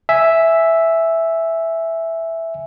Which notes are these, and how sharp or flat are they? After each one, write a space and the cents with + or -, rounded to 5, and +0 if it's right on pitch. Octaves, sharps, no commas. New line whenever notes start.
E5 +0 G#5 +0